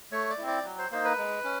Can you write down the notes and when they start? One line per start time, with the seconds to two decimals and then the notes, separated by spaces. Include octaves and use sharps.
0.12 A3 C#5
0.30 D5
0.38 C4 E4
0.48 D5
0.65 F#3
0.78 C5
0.91 A#3 D#4 C5
1.05 B4
1.18 G#3
1.45 C#4